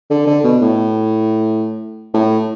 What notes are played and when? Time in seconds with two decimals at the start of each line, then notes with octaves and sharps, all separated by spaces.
0.10 D3
0.27 D3
0.44 B2
0.62 A2
2.14 A2